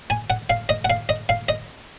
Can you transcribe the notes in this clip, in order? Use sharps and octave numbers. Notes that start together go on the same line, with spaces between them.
G#5
F#5
F5
D#5
F#5
F5
D#5
F5
D#5